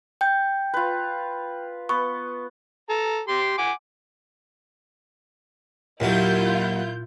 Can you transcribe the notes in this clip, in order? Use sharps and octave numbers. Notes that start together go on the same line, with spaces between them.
G5 G6
F4 B4
B3 C#6
A4 A#5
G4 C6
F#5 G#5 D6
D#2 A#2 F#3 E4 F4 G6